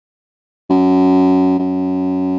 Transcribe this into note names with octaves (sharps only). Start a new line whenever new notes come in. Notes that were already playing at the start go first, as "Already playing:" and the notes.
F#2
F#2